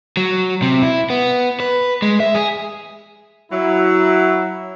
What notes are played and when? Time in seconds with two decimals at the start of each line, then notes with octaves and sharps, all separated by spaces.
0.17 F#3
0.62 C3
0.82 E4
1.10 B3
1.60 B4
2.02 G#3
2.20 E5
2.35 G#4
3.52 F#3 E4